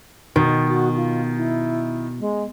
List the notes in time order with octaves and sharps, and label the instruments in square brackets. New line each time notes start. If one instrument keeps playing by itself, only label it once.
[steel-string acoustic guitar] B2 [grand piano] D#3
[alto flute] F#4
F4
E4
G#3